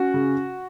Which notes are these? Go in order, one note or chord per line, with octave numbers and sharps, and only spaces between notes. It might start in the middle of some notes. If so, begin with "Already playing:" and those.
Already playing: C#4 F#4
C#3